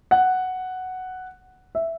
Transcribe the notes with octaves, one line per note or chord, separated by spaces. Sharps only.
F#5
E5